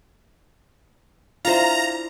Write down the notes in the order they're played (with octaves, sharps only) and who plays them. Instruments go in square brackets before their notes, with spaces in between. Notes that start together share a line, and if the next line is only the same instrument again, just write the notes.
[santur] D4 E4 [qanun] F4 C5 [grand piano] F5 [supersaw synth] A#5